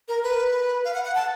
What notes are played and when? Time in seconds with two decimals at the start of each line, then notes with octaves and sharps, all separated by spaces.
0.09 A#4
0.23 B4
0.85 F5
0.94 F#5
1.05 F#5
1.15 A5